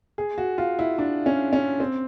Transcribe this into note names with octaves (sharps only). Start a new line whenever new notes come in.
G#4
F#4
F4
E4
D4
C#4
C#4
C4